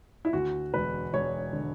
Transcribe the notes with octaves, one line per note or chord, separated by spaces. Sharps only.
E4
D2 F#4
E1 B4
E1 C#5
D3